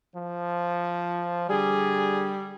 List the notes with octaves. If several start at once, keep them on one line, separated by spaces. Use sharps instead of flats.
F3
D3 G3 G#4